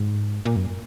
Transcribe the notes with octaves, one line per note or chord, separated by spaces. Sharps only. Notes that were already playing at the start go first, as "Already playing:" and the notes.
Already playing: G#2
A#2
F#2